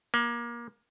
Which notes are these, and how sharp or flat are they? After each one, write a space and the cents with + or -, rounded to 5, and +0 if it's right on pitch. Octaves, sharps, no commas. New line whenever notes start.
A#3 +25